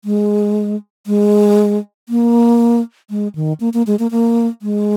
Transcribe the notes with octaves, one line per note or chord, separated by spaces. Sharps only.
G#3
G#3
A#3
G#3
D#3
A#3
A#3
G#3
A#3
A#3
G#3